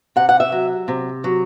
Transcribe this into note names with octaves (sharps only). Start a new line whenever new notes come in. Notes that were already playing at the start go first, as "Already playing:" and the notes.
C3 F#5
F#5
E5
F#3
C3
F#3